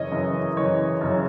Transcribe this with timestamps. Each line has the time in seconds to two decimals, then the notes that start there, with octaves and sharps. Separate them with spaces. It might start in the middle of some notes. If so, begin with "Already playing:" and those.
Already playing: F#2 C#3 E3 C#5 D#5
0.11 F#2 C#3 E3
0.56 F#2 C#3 E3 C#5
1.01 F#2 C#3 E3